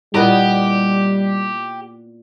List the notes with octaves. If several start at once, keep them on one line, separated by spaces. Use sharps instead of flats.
A#2 G3 B3 E4 F4 G4 A#4 D#5